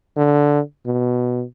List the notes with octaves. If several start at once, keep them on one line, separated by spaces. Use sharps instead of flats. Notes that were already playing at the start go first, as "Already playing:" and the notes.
D3
B2